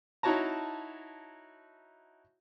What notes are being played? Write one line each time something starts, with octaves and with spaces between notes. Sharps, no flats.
D#4 E4 F#4 C#5 A5 A#5